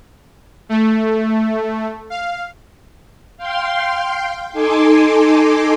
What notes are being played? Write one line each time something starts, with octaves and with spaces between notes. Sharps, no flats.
A3
F5
F5 G5 C6
D#4 A4 G#5 C6 D6